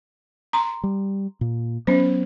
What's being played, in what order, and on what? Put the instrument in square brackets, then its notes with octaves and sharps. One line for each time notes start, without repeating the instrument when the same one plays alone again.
[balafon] A#5 C6
[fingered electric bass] G3
A#2
[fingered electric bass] F#3 B3 [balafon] C#4 C5